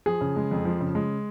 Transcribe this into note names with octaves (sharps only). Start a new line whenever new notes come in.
F3 G#4
C#3
G#3
F2
F3
C#3
G#3